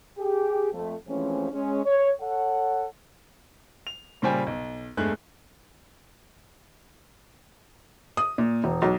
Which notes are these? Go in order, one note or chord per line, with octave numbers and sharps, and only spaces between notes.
G4 G#4
F2 A3
E3 F3 G#3 A3 C4 C#4
G#3 C#4
C#5
A4 C#5 F#5
F7
A#2 C#3 G3 C5 G5 G#5
B1
E1 G2 G#3 A3 G#4 F#6
D#6
A#2
E1
B1